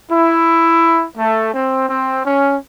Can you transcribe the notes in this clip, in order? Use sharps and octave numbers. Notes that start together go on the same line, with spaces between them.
E4
A3
C4
C4
C#4